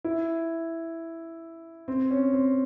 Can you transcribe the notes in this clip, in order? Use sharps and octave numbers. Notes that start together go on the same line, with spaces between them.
E4
C4
C#4
C4